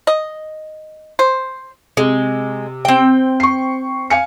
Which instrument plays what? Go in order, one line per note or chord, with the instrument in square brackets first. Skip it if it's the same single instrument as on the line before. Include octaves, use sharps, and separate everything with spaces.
[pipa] D#5
C5
[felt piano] C3 [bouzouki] G#3
[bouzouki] C4 G5
[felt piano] C#6 C7
F5 G#5 C#7